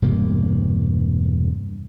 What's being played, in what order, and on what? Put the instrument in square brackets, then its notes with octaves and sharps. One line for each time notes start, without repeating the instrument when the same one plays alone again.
[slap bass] E1 G2 C3 A#3